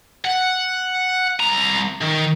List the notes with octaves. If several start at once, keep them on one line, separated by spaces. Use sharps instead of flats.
F#5
C2 A#5
D#3